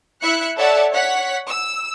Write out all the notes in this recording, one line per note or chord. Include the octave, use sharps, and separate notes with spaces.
E4 E5 F#6 C#7
A4 C#5 D5 E5 F#5 A5
C#5 F#5 B6
E6